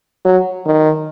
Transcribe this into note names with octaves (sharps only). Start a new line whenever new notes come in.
F#3
D#3